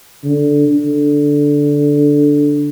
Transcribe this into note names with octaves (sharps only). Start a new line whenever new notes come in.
D3
D3